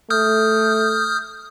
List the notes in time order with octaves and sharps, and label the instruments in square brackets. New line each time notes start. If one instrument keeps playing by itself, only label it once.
[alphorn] A3 [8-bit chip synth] D#6 F6 G6